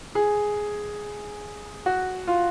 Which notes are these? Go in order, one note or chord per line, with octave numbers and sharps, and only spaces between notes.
G#4
F#4
F4